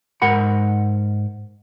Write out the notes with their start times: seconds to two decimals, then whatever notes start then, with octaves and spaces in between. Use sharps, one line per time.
0.22 G#2 A#4 F#5 B5